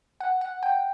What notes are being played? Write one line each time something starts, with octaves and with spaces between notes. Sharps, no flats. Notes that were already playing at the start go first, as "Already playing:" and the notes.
F#5
F#5
G5